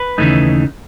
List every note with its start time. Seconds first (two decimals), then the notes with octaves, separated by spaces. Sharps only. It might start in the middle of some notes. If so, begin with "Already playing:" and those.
Already playing: B4
0.18 D#2 C#3 E3 A3 D#4